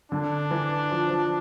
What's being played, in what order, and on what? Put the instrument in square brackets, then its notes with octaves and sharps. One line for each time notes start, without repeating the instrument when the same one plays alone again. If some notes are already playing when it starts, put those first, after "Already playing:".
[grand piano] D3 [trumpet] D4
[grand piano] E3
F3
F3